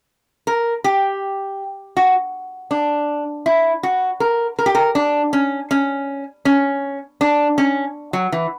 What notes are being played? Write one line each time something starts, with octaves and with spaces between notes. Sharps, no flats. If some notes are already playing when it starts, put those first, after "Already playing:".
A#4
G4
F#4
D4
E4
F#4
A#4
A#4
G4
A#4
D4
C#4
C#4
C#4
D4
C#4
F#3
E3